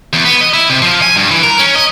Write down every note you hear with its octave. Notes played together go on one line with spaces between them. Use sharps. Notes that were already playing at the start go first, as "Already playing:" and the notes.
E2
B3
D#5
E4
C3
F3
G#5
G2
E3
A#4
C#4
D#5